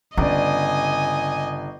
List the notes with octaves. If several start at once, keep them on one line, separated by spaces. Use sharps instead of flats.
G1 C#3 D5 D#5 G#5